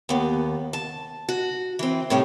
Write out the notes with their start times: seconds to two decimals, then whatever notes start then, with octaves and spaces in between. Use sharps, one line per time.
0.09 D#2 B3
0.73 A5
1.29 F#4
1.79 E3 C4
2.10 A2 C3 G3 C#4 D#4